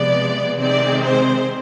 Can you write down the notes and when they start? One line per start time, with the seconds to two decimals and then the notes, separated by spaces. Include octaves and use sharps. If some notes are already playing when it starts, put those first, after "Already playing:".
Already playing: C3 F3 G#3 B3 D5
0.58 C3 D#3 G#3 C4 D5
1.03 C5